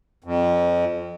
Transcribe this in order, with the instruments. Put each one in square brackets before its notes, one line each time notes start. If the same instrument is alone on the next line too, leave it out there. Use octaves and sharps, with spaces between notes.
[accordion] F2